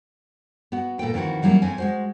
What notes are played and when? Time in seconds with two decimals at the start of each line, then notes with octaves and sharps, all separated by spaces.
0.72 B3 F#4
0.99 A#2 A4 B4 G5
1.14 F2 D#3 E3 F#4
1.43 E3 F#3 G3 A#3 C#4
1.62 F2 C4 G#5
1.78 G#3 F#4 C5